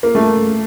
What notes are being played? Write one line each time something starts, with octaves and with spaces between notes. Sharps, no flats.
A#3
A3